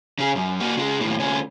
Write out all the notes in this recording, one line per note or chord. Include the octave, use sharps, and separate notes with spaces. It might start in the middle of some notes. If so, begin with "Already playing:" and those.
C#3 G#4
F#2
A#3 F#4
C#3 G#3
D#2 A2
D2 C#4